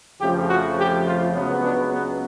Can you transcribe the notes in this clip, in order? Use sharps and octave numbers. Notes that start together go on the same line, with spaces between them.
F2 C#3 F3 A3 G4
F#4
G4
F4
C#2 C#3 F#3 B3
D4
B3